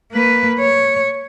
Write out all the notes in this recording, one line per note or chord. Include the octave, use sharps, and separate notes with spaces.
A#3 B4
C#5